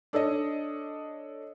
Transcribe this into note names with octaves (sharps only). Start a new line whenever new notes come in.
D4 A4 C#5 D#5